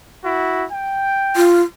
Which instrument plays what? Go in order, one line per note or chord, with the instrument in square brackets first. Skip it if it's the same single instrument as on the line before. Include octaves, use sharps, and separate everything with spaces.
[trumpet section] E4 F#4
G5
[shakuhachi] F4